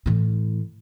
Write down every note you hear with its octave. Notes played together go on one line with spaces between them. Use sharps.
A2 E3